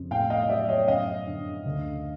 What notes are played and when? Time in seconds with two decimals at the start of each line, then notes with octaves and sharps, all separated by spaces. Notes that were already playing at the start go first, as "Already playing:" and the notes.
Already playing: F2 C#3
0.11 A2 F5 G5
0.30 D#5 F5
0.43 D#5
0.49 F#3 D5 E5
0.69 C#5 D#5
0.88 F#2 D#5 F5
1.26 D3
1.65 D2